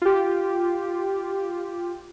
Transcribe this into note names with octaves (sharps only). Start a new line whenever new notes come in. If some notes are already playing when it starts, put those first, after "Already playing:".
F4 G4